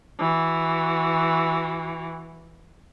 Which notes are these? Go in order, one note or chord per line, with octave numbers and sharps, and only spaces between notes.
E3 F#4